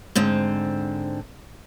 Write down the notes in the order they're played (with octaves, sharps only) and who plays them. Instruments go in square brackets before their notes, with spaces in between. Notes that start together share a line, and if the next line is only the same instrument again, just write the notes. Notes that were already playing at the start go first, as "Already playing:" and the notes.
[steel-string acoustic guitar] G#2 D3 C4